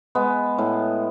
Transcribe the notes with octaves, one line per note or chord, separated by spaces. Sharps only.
G#3 B3
A2